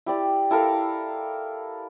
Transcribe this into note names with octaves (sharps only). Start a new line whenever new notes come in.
E4 G4 D5
E4 A4 A#4 F5